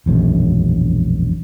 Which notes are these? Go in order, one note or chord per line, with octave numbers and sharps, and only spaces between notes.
E1 A#1 F#2 G#3